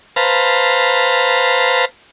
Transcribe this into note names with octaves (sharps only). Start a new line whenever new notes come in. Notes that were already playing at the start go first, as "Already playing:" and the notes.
B4 C5 F5 A5 A#5